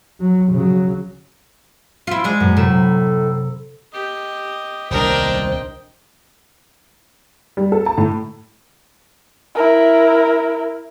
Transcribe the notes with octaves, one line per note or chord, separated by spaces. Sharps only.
F#3
C#3 F#3
E4 F4
G#3 D4
F#2 A#2
A2 C3 B5 E7
G4 D#5
D#1 C2 D4 A#4 C5 D#5 G5
G3
A4
A5
A2
E4 A#4